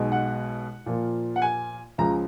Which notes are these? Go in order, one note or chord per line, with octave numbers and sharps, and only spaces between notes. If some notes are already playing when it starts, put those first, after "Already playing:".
Already playing: B1 B2 G#3 D#4
F#5
A#2 F3 A#3 F4
F#5
G#5
C#2 C#3 F3 A#5